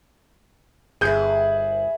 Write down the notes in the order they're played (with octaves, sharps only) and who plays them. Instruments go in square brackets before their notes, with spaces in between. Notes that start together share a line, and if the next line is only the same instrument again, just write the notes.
[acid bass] G1 [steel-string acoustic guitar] E4 B4 [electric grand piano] G#4 G6